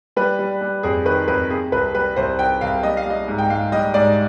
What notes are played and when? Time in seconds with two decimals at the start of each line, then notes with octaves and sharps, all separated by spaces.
0.16 G3 B4
0.39 G3
0.61 G3
0.83 F2 G#4
1.05 D#3 B4
1.28 F2 B4
1.50 C3 G#4
1.72 C2 B4
1.94 G3 B4
2.16 C2 C5
2.39 C2 G5
2.61 C2 F5
2.83 G3 D#5
2.97 F5
3.06 G3 D#5
3.28 G#2
3.38 G5
3.50 G#2 F5
3.72 G3 D#5
3.94 G#2 D5